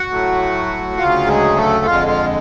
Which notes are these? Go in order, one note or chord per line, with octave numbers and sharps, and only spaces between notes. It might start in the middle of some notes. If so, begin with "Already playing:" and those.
Already playing: F#4 F#5
A2 F#3 A3
D2 C#3 F#3 F4 F5
G#3 G#4
A3 A4
F2 D3 G#3 F4 F5
F4 F5